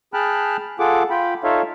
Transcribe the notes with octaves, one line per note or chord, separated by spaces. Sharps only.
G#4 G5 A5 B5 F6 F#6
F4 G#4 A4 F#5 D6
F4 G5 B5
D#4 F4 A4 C#5 E5 F5